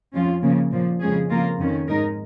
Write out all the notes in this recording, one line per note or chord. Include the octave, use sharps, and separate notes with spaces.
F2 F3 C#4 F4
C#3 F3 A#3
A#2 F3 A#3
F2 C#3 G#3 C#4 G#4
F2 C#3 A#3 F4 A#4
F2 D#3 C#4
G#2 G#3 D#4 A#4